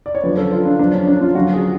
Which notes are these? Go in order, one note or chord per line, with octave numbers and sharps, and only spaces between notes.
D5
C#5
F#2 D3 F3 B4
A4
F4
D4
F#2 F3 D4
C#4
D4
F4
F#2 D3 F3 F#4
G#4